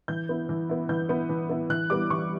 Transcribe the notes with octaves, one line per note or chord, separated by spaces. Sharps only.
E3 G6
B3 E4
E3
B3 E4
E3 G6
B3 E4
E3
B3 E4
E3 F#6
G3 B3 E4 D6
E3 C#6